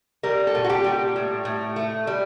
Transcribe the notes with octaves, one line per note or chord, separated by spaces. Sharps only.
G3 A#4
A4
A#2
F#4
G4
G3
A2
A2
A3
G3